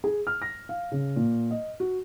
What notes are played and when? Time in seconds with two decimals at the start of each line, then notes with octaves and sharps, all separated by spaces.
0.04 G#4
0.27 F6
0.42 A#6
0.69 F5
0.92 C#3
1.16 A#2
1.51 D#5
1.80 F#4